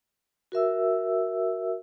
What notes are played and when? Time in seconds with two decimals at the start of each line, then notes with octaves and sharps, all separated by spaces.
0.52 F#4 A#4 E5 E6